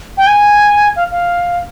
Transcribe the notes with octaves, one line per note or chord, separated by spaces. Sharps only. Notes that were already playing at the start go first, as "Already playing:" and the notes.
G5
G#5
F5
F5